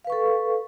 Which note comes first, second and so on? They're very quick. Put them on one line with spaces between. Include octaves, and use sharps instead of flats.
F5 B4 C#6 A4